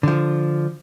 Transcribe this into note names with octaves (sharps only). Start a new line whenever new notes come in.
D3 F3